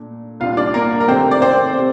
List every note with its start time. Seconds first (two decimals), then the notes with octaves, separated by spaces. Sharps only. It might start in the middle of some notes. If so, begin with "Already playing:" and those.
Already playing: A#2 A3 D4
0.40 C2 A#2 G3 D4 F4 F5
0.57 D4 D5
0.74 A#3 A#4
1.00 A#4
1.08 C3 D#3 A3 C4 C5
1.31 D5
1.42 C4 C5
1.77 C3